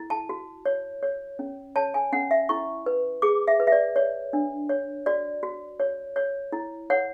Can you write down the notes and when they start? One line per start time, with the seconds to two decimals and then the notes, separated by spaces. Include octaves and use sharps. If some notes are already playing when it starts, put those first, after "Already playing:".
Already playing: E4
0.10 A5
0.29 F#4
0.66 C#5
1.03 C#5
1.39 C#4
1.76 C#5 A5
1.94 G#5
2.12 C#4 F#5
2.31 E5
2.49 E4 C#6
2.86 B4
3.22 G#4 D6
3.48 E5
3.60 B4
3.67 E5
3.72 D5
3.96 C#5
4.33 D4
4.69 C#5
5.06 F#4 D5
5.43 F#4
5.80 C#5
6.16 C#5
6.52 E4
6.90 C#5 F#5